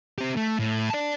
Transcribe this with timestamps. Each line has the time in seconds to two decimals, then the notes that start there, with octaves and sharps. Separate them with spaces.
0.18 C4 G4
0.37 A3
0.59 A2
0.90 D5 A5